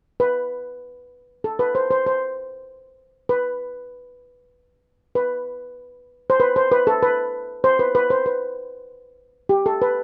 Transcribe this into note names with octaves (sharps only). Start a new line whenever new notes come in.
B4
A4
B4
C5
C5
C5
B4
B4
C5
B4
C5
B4
A4
B4
C5
B4
B4
C5
B4
G4
A4
B4